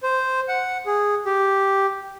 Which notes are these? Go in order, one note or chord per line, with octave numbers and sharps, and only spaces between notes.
C5
F#5
G#4
G4